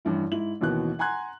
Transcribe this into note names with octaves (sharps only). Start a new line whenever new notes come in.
A1 G2 E4
G#2 E4 F#7
A1 D#2 B2 E3 F#6
F#5 G#5 A#5 C6 F#6 G#6